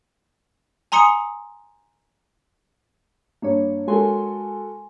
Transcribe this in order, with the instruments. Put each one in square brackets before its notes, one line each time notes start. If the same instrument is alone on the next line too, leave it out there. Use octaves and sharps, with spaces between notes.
[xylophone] G#5 A#5 C6 D#6 C#7
[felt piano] G2 [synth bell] A#3 D4 C#5
[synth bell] G#3 G#5 C6 [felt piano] F#4 A4 A#4